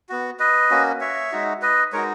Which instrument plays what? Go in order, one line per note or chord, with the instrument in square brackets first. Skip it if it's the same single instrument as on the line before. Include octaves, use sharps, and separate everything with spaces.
[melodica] B3 F#4
B4 D#5
A#3 C#4 F#4
C#5 E5
G#3 D#4 F#4
B4 D#5
G#3 D#4 F#4 A#4 C#5